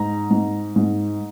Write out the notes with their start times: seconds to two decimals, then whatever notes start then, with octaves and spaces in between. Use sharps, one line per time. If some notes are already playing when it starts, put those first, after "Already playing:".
Already playing: G#2 A#5
0.31 G#2
0.76 G#2